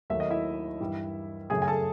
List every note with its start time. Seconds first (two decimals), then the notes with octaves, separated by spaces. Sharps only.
0.10 D#2 D#3 F#3 A3 E5
0.20 D#5
0.30 E4 E5
0.80 G2 E3 G3
1.50 F#2 C#3 F#3 A3 G#4 G#5
1.62 G#5
1.68 A4 A5